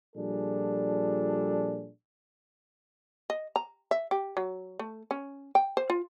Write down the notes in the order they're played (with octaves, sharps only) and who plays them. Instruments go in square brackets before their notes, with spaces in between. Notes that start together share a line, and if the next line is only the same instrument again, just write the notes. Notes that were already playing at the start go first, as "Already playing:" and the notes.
[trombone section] A#2 F3 G3 D4 G#4 A4
[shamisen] D#5
A#5
E5
G4
F#3
A3
C#4
G5
C5
F4